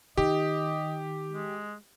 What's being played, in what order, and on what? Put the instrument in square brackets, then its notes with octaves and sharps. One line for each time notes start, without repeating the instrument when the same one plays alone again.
[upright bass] D#3 [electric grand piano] G4 [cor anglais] D#5
[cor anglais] G#3